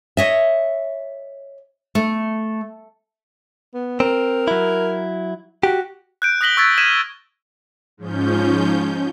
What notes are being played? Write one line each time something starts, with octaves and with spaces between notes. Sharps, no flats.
C#5 D#5 E5
A3
B3
C4 A#4
F#3 E4
F#4 G4
F#6 G6 D7
D#6 F#6 A#6 B6 F#7 G7
C#6 E6 F#6 G#6 A6 B6
F6 G#6 B6 D#7 E7
G#2 F3 C#4 G6